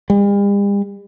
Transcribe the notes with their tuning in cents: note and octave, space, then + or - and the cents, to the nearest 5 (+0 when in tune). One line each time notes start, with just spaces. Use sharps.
G3 +45